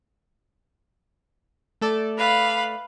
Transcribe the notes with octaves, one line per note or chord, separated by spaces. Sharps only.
A3 A4 D5
B4 F5 B5